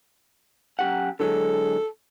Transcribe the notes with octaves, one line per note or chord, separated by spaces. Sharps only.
F#2 G4 F#5
D3 F#3 G#3 A4